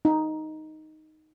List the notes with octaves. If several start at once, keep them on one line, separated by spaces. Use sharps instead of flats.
D#4